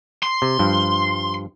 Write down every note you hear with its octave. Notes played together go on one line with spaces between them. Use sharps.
C6
C3
G2 F3